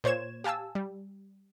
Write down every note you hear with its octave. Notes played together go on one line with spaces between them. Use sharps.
A#2 C5 C#5 G#6 E7
G4 F5 G#5 A5 E6
G3